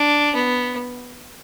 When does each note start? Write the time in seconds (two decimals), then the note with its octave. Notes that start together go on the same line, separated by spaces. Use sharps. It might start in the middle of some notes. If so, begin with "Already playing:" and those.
Already playing: D4
0.35 B3